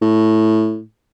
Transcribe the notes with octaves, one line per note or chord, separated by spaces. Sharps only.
A2